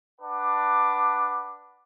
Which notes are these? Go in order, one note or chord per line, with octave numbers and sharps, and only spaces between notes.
D4 B4 F#5 D6